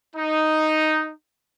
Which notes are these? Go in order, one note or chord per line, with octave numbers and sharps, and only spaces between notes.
D#4